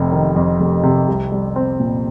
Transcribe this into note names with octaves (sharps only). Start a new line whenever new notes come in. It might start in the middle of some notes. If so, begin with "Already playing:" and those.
Already playing: F1 C3
D#3
F2
F1
C3
C2
G3
C4
A#2